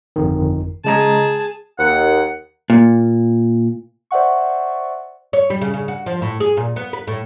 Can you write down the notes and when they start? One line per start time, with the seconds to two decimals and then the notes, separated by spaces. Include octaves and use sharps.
0.16 G1 F2 D#3
0.85 C#3 G#3 G#4 A5 A#5
1.79 D#2 F#5
2.70 A#2
4.11 C5 D5 E5 F#5 C#6
5.33 C#5
5.50 G3
5.61 C#3
5.74 C#3
5.88 F#4
6.06 F3
6.22 A2
6.40 G#4
6.57 A#2
6.76 B3
6.93 B4
7.08 A2